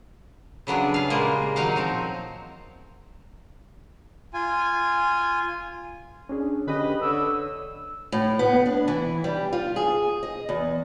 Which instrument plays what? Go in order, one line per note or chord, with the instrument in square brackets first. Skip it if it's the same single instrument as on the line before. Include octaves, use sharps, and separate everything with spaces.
[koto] C#3 F#3 B3 D4 G#4
G#4 F5
A#2 C#3 G3 G#3 A#3
D#3 F#3 D#4 F5 F#5
F3 F#3 C4
[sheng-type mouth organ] F4 G#5
[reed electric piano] C#4 D4 G#4
[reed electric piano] D3 C#4 G4 [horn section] B4 D#5
[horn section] D3 [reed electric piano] D4 C#5 [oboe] E6
[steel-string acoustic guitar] A2
B3
D4
E3
G3
F4
G#4
D#5
E2